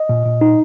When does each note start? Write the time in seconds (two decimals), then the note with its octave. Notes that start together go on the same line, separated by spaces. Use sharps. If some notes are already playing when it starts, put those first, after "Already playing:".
Already playing: D#5
0.09 A#2
0.26 A#2
0.41 D#4